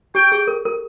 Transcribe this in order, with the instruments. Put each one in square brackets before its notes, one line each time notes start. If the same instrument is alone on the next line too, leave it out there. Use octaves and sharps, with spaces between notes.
[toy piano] G4 [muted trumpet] G5
[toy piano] G#4
A#4
A#4